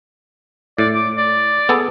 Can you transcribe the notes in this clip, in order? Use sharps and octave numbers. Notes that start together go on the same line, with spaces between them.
A2 D5
D6
D5
B3 G#4 A4